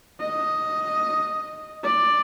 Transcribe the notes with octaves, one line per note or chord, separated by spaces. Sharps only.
D#5
D5